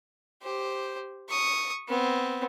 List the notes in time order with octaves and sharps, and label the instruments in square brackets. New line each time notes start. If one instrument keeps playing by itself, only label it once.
[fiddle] G4 C5
C#6 D#6
B3 C4